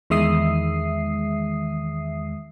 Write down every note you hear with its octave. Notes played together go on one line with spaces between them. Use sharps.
E2 D#3 G#3 E5 D#6 C7